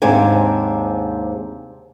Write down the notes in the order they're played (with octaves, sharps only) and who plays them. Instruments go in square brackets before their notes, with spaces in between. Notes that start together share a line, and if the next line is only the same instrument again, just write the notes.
[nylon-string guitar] D#2 G#2 C3 D4 G#5